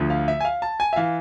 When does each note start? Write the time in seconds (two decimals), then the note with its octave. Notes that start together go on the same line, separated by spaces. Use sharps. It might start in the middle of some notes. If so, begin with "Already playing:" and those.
Already playing: D2 D3 F3
0.10 F5
0.28 E5
0.40 G#5
0.45 F5
0.62 A5
0.80 G#5
0.93 E5
0.96 E3 F5